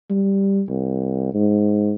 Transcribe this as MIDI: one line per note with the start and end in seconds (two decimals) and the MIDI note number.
0.10 0.63 55
0.69 1.29 36
1.34 1.93 44